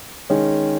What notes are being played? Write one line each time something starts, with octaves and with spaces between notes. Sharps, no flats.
D#3 G#3 C#4